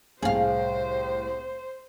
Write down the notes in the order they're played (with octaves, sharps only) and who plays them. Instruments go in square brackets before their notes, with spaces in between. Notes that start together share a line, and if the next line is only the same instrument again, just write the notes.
[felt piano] C2 A2 [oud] G#4 F5 [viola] C5